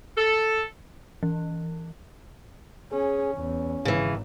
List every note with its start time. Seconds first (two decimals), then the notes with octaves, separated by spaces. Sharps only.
0.17 A4
1.23 E3
2.92 C#4 G#4
3.34 E2 C#4
3.85 G#1 C#3 E3